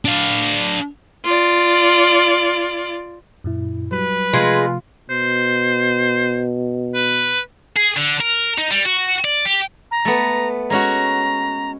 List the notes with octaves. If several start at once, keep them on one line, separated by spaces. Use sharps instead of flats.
D4 F5
F4 D5
F#2 A#2 E4
F#3 G3 B4
C3 F3 G#3 A3 F4
B2 C5
B4
G#4
D3
A#4
D#4
G3
F#4
D5
G4
A#5
A3 B3
G#3 C#4 F#4 A#5